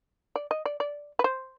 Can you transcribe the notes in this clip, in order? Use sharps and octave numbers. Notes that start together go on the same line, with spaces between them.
D5
D#5
D5
D5
B4
C5